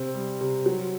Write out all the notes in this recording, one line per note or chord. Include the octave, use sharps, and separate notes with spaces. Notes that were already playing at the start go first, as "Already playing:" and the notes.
Already playing: C3 C4
G3
C3
F#3